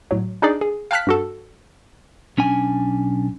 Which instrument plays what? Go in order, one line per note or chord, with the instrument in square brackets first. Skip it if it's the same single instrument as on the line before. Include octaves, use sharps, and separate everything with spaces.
[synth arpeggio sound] A2 F#3
D4 D#4 G#4 D5
G#4
F5 G5 A5 F6 F#6 B6
G2 F#4 A4
[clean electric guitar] B1 C#4 D4 G#5